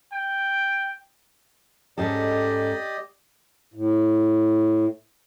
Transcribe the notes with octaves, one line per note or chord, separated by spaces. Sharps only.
G5
G#2 C#4 G4 A4 D5 D#5
A2